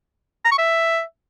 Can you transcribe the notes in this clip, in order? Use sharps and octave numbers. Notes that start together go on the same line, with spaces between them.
A#5
C#6
E5